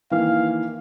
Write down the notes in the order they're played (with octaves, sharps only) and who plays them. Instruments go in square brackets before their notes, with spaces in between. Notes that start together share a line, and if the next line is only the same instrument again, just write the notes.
[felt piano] D#3 E3 A#3 [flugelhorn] F5